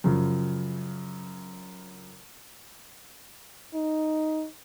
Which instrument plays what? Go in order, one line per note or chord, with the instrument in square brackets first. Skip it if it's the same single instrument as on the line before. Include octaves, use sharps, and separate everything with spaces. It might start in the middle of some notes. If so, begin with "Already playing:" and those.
[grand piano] F#2 C#3 F3
[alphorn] D#4